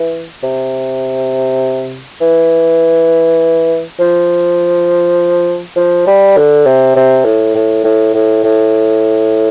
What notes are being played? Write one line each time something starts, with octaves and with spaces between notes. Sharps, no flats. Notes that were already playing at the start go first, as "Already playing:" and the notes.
Already playing: E3
C3
E3
F3
F3
G3
D3
C3
C3
A2
A2
A2
A2
A2